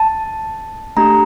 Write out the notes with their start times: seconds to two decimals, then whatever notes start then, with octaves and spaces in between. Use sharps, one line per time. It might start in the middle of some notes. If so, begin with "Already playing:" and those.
Already playing: A5
0.97 A3 D4 G4 A#5